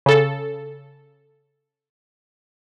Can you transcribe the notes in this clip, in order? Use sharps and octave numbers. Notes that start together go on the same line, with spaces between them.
C#3 A4